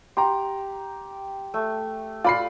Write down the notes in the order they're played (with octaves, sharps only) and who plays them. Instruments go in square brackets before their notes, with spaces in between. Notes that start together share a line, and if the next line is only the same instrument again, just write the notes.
[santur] G4 [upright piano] A#5 C6
[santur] A3
[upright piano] F4 B5 C7 [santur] D5